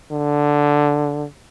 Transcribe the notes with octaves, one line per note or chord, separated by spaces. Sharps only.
D3